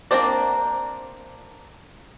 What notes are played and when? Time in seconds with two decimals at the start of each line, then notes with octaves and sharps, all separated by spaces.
0.11 A#3 C4 D4 C5 D5